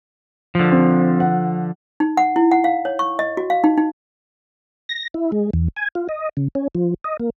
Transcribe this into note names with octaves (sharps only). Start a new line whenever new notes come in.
D3 F3
C4
F#5
D#4
F#5
E4
F#5
F5
C#5
C#6
D#5
F#4
F5
D#4
D#4
A#6
E4
G#3
E2
G#5
F4
D#5
C#3
C#4
F3
D#5
A#3